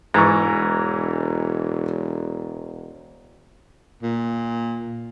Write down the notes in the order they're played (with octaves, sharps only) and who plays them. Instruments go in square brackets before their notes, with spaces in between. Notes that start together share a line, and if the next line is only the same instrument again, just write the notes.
[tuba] E1 [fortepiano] G#2 E3 C#6 [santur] A#5
[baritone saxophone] A#2